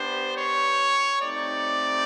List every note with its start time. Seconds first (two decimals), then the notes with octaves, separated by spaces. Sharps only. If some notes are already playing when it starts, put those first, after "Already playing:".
Already playing: B3 D4 G4 C5
0.35 C#5
1.21 A3 C4 D#4 G4 D5